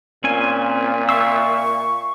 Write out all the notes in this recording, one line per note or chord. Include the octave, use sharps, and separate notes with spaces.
A#2 C4 C#4 G#5
E5 F5 C#6 E6